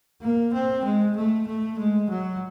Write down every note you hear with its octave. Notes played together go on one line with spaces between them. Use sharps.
A#3
C4
G#3
A3
A3
G#3
F#3